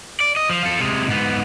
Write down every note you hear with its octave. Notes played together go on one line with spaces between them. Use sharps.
D5
D#5
F3
F3 A4
C3 G#3
G#2 B3